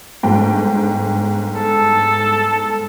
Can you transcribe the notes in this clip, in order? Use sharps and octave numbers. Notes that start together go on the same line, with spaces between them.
G1 G#2 G5
A4